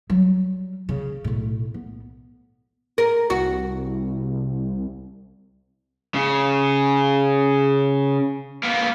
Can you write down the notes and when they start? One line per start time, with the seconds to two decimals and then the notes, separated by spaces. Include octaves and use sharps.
0.10 F#3 G3
0.89 C#3
1.24 B1 A2
1.74 B3
2.98 A#4
3.30 C2 F#4
6.14 C#3
8.63 A#3 B3